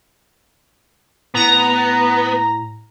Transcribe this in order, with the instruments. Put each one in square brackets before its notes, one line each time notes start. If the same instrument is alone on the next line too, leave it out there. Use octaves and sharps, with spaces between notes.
[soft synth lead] A2 [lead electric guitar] B3 [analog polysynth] A#5